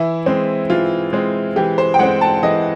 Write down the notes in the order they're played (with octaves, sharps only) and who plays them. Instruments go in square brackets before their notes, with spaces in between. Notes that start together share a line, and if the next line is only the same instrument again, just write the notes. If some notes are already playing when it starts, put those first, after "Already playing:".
Already playing: [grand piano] E3 [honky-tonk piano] E4
[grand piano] G#3 C4
[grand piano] E3 [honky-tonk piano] F4
[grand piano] G#3 C4
[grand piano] E3 [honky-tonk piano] G4
[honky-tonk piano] C5
G5
[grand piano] G#3 C4 [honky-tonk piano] F#5
[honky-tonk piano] A5
[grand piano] E3 [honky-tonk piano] D#5